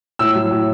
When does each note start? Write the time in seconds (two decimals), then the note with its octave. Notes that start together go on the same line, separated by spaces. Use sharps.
0.19 A2 E6
0.35 F#3
0.51 A2